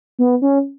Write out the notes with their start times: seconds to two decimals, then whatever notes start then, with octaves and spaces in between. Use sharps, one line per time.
0.19 B3
0.42 C#4